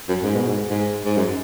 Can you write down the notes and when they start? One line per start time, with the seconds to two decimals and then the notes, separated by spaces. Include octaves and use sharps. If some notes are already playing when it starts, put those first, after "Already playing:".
0.08 F#2
0.23 G#2
0.35 B2
0.48 G#2
0.70 G#2
1.05 G#2
1.16 F#2